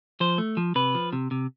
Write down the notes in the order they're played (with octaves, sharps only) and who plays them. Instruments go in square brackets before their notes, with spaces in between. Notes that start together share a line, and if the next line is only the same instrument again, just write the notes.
[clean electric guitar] F3 C5
A3
F3
C3 B4
F3
C3
C3